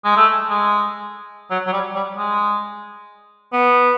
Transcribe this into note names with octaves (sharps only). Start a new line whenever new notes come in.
G#3
A3
G#3
F#3
F#3
G3
G3
G#3
B3